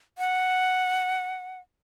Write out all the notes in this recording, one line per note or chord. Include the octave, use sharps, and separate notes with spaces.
F#5